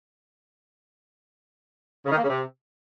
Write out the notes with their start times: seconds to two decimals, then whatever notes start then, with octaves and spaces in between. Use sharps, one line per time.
2.06 C#3
2.12 D#3
2.18 A#3
2.24 C#3
2.30 C3